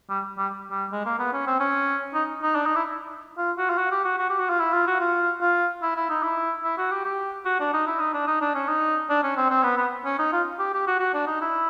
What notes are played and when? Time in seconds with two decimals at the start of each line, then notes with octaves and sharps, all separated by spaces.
0.10 G3
0.38 G3
0.71 G3
0.92 G#3
1.06 A#3
1.19 B3
1.33 C#4
1.47 C4
1.60 C#4
2.14 D#4
2.42 D#4
2.55 D4
2.66 D#4
2.75 E4
3.37 F4
3.58 F#4
3.70 F4
3.78 F#4
3.92 G4
4.05 F#4
4.18 F#4
4.30 G4
4.39 F#4
4.49 F4
4.60 E4
4.73 F4
4.87 F#4
5.01 F4
5.41 F4
5.82 E4
5.96 E4
6.10 D#4
6.23 E4
6.64 E4
6.78 F#4
6.91 G4
7.04 G4
7.45 F#4
7.60 D4
7.74 D#4
7.87 E4
8.00 D#4
8.14 D4
8.27 D#4
8.41 D4
8.55 C#4
8.68 D#4
9.10 D4
9.23 C#4
9.37 C4
9.51 C4
9.63 B3
9.77 B3
10.05 C#4
10.19 D#4
10.33 F4
10.59 G4
10.73 G4
10.87 F#4
11.00 F#4
11.14 D4
11.27 D#4
11.41 E4